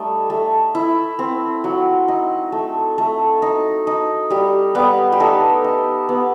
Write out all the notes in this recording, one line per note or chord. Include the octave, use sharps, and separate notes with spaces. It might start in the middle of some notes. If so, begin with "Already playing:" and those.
Already playing: G3 A3 D#4
A3
E4
C4
F#3
D#4
A3
A3
D#4
D#4
G3 G4
G3 B3 B4
G4
A3 D#4 A4
D#4
B3